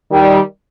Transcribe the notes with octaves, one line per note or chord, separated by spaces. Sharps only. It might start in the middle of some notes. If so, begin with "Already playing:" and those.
D#3 G3